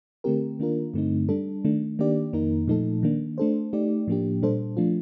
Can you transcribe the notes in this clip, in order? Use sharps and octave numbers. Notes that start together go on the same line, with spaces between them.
D3 A3 C4 G4 A#4
D#3 A#3 D4 F4 A#4
G2 D3 A3 C4 D#4
G3 D4 A4
D#3 A3 D4
D#3 A#3 D4 G4 D5
F2 D#3 A#3 D#4 A#4
A#2 F3 A3 D#4 A4
D#3 A#3 D4
A3 D4 A4 C5
A3 D#4 G4 D5
A2 F3 A#3 D4 G4
A#2 G3 D4 A4 C5
F3 A3 D4 F4